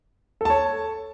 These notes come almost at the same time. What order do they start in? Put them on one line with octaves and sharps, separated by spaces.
A4 A5 C#5